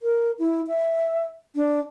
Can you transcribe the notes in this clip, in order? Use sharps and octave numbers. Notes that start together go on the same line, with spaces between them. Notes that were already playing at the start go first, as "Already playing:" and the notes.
A#4
E4
E5
D4